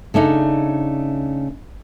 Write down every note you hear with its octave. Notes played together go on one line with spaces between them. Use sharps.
C#3 A3 D4 D#4